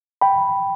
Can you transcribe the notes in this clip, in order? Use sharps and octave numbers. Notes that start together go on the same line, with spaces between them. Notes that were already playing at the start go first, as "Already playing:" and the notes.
G5 B5